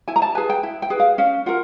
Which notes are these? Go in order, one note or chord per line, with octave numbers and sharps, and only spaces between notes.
E4 G#5
A#5
A5
G#4 B4 G#5
G5
E4
G5
G#4 B4
F5
C#4 F5
F4 A#4 F#5